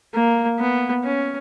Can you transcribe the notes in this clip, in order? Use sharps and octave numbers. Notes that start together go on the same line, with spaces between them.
A#3
B3
C#4